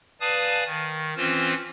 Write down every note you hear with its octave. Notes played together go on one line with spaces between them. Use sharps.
B4 D5 F5 G#5 A5 D#6
D#3
E3 C4 C#4 F4 C5